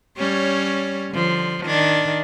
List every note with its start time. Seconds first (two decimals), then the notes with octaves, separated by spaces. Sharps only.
0.18 G3 C#4 C#5
1.11 D3 F3
1.65 D#3 D4